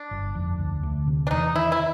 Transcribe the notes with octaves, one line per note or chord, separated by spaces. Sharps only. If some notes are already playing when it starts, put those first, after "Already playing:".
Already playing: D4
G1
F2
D2
D2
C3
D4
E2 D#4
D#3 E4
E4